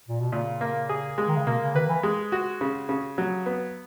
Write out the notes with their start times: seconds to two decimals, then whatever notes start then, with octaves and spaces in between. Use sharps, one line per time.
0.09 A#2
0.20 B2
0.32 A#2 C#3
0.61 A#3
0.89 G#4
1.18 G#3
1.28 D#3
1.37 C#3
1.46 B2 A#3
1.61 C#3
1.75 D#3 B4
1.89 E3
2.03 G#3
2.32 F#4
2.61 C#3
2.89 C#3
3.18 F#3
3.46 B3